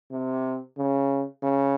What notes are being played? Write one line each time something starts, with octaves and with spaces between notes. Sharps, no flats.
C3
C#3
C#3